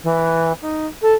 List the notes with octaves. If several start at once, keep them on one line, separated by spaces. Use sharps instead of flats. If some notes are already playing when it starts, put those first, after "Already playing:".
E3
D#4
A4